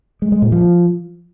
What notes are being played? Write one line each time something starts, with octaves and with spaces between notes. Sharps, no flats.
G#3
G#3
A#2
F3